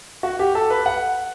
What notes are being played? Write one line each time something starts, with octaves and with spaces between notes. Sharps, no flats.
F#4
G4
A4
B4
F#5